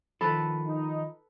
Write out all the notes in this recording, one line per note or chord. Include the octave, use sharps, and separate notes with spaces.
D#3 F3 A4 B4 B5
D#4